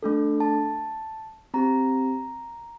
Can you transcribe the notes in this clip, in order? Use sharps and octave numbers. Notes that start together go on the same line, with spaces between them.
A3 D4 A4
A5
C4 G4 A#5